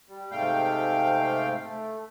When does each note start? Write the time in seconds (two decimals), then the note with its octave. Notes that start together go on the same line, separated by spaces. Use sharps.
0.09 G3
0.31 G#2 C3 A3 F5 G5
1.61 A3